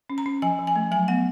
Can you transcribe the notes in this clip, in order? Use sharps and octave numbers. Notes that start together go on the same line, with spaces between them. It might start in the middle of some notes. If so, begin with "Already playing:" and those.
C#4
A#5
C#4
F3 G#5
F3
G#5
A3
F#3 G#5
B3 F#5